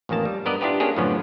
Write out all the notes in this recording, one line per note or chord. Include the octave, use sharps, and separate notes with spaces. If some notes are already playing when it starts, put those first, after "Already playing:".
A1 F2 D#3 A#3 A5
G3
G2 B3 A#4 D5 D#5
D4 E4 F4 G4 B4
A#3 C#4 D4 G4 G#4
F#2 A2 D3 F3 B3 C#4